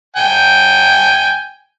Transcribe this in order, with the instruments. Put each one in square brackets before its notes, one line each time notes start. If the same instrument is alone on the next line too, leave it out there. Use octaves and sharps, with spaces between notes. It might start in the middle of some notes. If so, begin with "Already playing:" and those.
[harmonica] G5 G#5